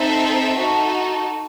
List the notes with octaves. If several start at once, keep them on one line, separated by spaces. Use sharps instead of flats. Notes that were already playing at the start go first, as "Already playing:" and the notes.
Already playing: C4 D#4 A4 E5
D#4 F#4 A4